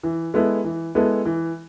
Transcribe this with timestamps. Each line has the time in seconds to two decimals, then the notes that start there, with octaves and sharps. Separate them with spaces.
0.03 E3
0.34 G#3 B3 E4 A4
0.64 E3
0.95 G#3 B3 E4 A4
1.25 E3